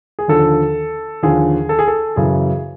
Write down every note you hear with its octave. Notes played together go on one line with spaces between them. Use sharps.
G#4
D#2 D3 F3 A4
D#2 D3 F3 G#4
A4
G#4
A4
F#2 C#3 E3 G#4